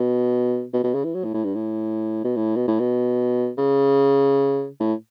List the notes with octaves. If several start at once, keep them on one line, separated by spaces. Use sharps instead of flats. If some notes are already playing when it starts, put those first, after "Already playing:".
Already playing: B2
B2
B2
C#3
E3
F#3
A2
A2
G2
A2
B2
A2
B2
A2
B2
C#3
A2